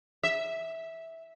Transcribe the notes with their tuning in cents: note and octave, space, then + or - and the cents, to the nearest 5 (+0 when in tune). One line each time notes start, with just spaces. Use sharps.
E5 -10